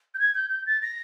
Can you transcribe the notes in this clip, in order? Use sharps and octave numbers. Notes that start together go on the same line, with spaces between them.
G6
G#6
G6
G6
A6
A#6